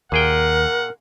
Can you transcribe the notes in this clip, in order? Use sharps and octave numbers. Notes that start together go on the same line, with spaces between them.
D#2 A#2 G#4 A#4 F#5 G5